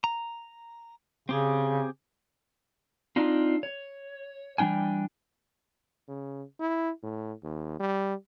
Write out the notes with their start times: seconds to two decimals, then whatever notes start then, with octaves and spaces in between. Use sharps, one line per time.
0.04 A#5
1.29 C#3 C4 G4 G#4
3.16 C4 D4 D#4 F4
3.63 C#5
4.58 E3 G3 D4 G5 G#5
6.08 C#3
6.60 E4
7.03 A2
7.43 D#2
7.80 G3